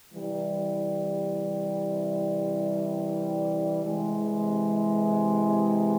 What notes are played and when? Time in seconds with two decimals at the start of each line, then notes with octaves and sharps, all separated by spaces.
0.14 C3 E3 G3
3.83 C3 E3 G#3